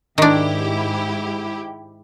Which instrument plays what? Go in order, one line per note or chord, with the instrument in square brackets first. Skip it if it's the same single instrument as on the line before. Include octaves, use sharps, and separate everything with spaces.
[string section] G#2 E4 G4 [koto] D#3 D4